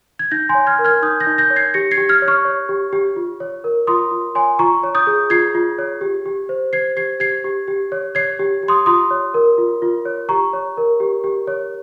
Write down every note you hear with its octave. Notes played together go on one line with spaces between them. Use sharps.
G#6
D#4 G6 A#6
G#5 C6
C#5
F6 G#6
A#4
F6 G#6
D#4 D#6 G6
G6 A#6
D#4
G6 A#6
C#5
G#6 C7
G4 A#6 C#7
G#6 C7
G4
F6 G#6
C#5
C#6 F6
C#5
G4
G4
F4
C#5
A#4
F4 C6 D#6
F4
C#5 G#5 C6
F4 A#5 C#6
C#5
D#6 G6
G#4
F4 G#6 C7
F4
C#5
G4
G4
C5
C5 G#6 C7
G4 G#6 C7
G4 G#6 C7
G4
G4
C#5
C#5 G#6 C7
G4
G4
C6 D#6
F4 C6 D#6
C#5
A#4
F4
F4
C#5
G4 A#5 C#6
C#5
A#4
G4
G4
C#5